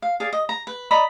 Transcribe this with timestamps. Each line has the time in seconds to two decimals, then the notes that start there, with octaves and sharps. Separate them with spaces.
0.02 F5
0.20 G#4 D5 F5
0.33 D#5
0.49 A#5
0.67 B4
0.91 D5 D#5 A#5 B5